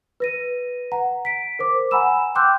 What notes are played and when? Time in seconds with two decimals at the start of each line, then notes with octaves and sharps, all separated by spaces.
0.20 B4 A#6 D#7
0.92 F#5 A#5
1.25 B6 D7
1.59 A#4 C5 D6
1.91 F#5 G#5 A#5 B5 E6 E7
2.35 G5 C6 D6 E6 F#6 G6